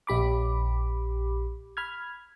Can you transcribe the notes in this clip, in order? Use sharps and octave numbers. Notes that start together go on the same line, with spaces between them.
A#1 G4 B5 D6
B5 F6 G#6